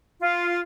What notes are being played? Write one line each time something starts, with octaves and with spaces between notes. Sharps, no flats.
F4